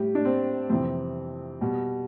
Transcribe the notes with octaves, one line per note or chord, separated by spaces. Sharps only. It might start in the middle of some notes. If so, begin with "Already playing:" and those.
Already playing: A2 G3 G4
D4
C4
F2 C3 E3 G3 C4
B2 G3